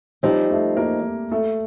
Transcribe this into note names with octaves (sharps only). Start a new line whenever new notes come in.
F3 G3 C4 D#4 G4
A3 A4
A#3 A#4
A3 A4